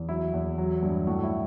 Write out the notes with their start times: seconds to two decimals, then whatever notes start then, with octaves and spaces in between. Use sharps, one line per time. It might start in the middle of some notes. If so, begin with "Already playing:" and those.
Already playing: E2
0.09 F#3 E4
0.33 E2
0.58 F#3
0.83 G2
1.07 A2 F#4
1.23 E4